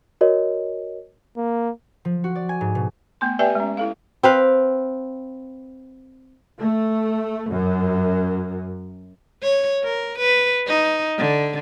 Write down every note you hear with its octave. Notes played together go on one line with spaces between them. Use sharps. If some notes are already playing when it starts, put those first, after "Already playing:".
F#4 A#4 C#5 D#5
A#3
F3
F#4
D5
G#5
G#2
B2
A3 B3 C6
G4 B4 D5 E5 G5 G#5
G#3 C#4
E4 A4 F5
C4 B4 F5
A3
F#2
C#5
A#4
B4
D#4
D3